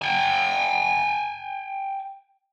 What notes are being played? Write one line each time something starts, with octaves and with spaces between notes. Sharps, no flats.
G5 G#5